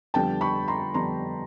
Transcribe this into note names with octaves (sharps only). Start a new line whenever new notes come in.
F2 D3 G3 B3 D4 G5 A5
B5 C#6
A#5 C6
F2 D3 G3 B3 D4 A#5 C6